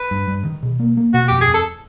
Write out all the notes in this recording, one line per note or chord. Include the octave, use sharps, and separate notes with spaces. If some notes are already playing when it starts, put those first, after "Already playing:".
Already playing: B4
G2
G2
D#3
B2
A#3
A#3
B2 F#4
F2 G4
G#4
F2
A4